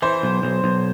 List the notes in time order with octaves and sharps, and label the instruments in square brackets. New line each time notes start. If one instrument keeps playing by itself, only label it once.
[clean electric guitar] E3 [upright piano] C5
[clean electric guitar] B1
B1
B1